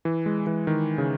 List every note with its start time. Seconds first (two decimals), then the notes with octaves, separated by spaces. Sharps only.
0.05 E3
0.26 G#3
0.47 E3
0.67 D#3
0.98 C#3